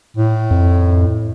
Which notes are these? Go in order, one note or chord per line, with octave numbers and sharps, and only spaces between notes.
A2
F2